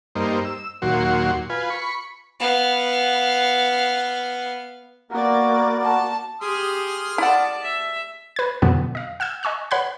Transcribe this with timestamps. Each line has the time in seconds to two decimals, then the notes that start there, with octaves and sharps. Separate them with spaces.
0.15 G2 A#3 D#4 C5
0.45 E6
0.82 D#2 A#2 F#3 F#4 C6
1.50 F4 B4 G#5
1.70 B5 C#6
2.40 B3 F5
5.11 A#3 B3 F#4 A#4 D5
5.83 A5
6.41 G4 G#4 C6 D#6 F6
7.18 E4 D5 F#5 A5
7.63 E5
8.36 B4 G#6
8.62 F2 B2 D3 F3 F#3 B3
8.95 D#5 F5
9.20 F#5 E6 F6 G6
9.43 D#5 G#5 C#6 E6 F#6
9.71 B4 C#5 F#5 B5 F#6 G#6